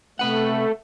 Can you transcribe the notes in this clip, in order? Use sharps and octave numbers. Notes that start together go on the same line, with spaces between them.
C3 A3 B4 F#5